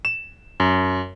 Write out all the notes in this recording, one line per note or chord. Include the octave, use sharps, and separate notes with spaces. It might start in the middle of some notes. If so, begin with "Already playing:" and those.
E7
F#2